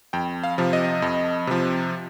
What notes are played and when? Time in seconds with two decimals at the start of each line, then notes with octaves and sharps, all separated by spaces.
0.13 F2 G5
0.44 F5
0.58 C3 F3
0.73 D#5
1.02 F2
1.47 C3 F3